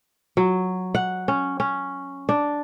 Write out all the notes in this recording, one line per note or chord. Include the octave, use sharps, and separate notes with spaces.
F#3
F#5
C#4
C#4
D4